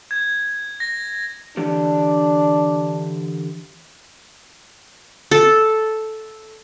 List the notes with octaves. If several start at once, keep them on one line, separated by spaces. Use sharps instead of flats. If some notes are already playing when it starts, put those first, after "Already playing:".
G#6
A#6
D3 E3 D4 G4
A4